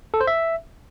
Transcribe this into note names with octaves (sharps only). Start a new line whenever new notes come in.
A4
C5
E5